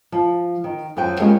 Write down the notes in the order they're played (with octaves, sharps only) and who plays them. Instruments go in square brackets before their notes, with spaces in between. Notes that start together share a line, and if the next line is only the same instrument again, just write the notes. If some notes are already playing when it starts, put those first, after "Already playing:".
[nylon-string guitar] F3
D#3
F#2 F3 F#3 G5
G3 G#3 A#3 C#4 F4